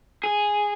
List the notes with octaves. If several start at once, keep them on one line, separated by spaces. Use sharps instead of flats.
G#4